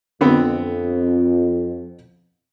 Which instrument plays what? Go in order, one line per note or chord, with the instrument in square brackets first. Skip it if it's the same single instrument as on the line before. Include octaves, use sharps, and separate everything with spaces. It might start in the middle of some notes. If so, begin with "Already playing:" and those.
[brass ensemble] F2 [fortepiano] D3 B3 C4